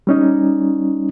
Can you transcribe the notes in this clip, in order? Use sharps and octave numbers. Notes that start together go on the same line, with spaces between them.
G3 C#4 D#4